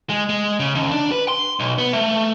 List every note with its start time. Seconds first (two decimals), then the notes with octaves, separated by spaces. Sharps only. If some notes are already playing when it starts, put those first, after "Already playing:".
0.10 G#3
0.29 G#3
0.60 C#3
0.75 D#2
0.91 D4
1.11 B4
1.28 C6
1.60 B1
1.78 B3
1.93 A3